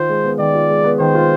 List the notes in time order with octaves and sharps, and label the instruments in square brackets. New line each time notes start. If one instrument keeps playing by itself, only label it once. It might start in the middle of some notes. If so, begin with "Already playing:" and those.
Already playing: [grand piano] D#3 F4 [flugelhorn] C5
[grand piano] G#3
B3
[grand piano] D#3 [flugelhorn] D5
[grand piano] F4
G#3
B3
[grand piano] D#3 [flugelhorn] C5
[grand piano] F4